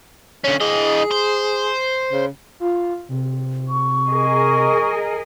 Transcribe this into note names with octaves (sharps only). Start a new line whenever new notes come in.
D3 C#4 C#5
E3 G#4 D#5
C5
C#3
F4
C3
C#6
G#4 A#4 D#5